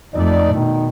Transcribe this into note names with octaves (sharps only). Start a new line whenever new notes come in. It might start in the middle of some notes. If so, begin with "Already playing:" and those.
F2 A3 D#4 D5
B2 D#3 D#4